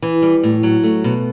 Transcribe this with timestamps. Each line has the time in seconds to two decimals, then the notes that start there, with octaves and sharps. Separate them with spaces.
0.02 E3
0.22 G3
0.43 A2
0.63 F#3
0.84 A3
1.04 B2